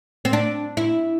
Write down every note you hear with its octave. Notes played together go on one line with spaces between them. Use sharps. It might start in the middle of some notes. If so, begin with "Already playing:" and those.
C4
D4
E4